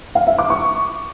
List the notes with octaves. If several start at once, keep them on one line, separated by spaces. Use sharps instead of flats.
F5
E5
D6
C#6